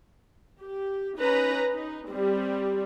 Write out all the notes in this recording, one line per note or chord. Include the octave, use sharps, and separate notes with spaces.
G4
C#4 D#4 B4 A#5
D#4
G3 C4